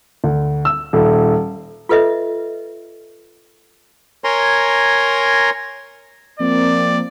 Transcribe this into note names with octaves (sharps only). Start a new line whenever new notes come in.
D2
E6
D#1
F4 A4 B4 D#5 E5
A#4 C#5 G#5 A#5 C6
F3 A#3 C4 D5